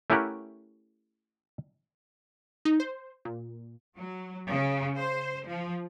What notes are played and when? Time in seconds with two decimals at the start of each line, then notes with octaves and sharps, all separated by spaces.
0.10 A3 C#4 E4 G4 A#4 F#5
2.65 D#4
2.80 C5
3.25 A#2
3.96 F#3
4.48 C#3
4.97 C5
5.46 F3